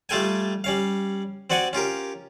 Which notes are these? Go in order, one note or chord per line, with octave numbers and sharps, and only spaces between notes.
G3 A3 F4 A4 G5 G#5
G3 C#4 F5
C4 F#4 D5 F#5 G#5
C#4 F4 G4 A#4